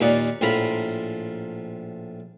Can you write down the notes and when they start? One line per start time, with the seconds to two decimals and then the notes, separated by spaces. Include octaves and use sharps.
0.01 D#2 A#2 D#4 D5 F#5
0.41 A#1 A2 F3 A#4 A#5 B5